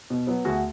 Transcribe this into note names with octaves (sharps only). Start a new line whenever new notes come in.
B2
F#3 B3
D2 F#4 G#4